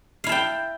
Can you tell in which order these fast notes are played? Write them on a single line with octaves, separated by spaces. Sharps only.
F5 E4 A5 G5